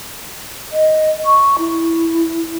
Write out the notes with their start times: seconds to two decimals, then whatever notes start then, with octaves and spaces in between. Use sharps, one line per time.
0.72 D#5
1.25 C#6
1.58 E4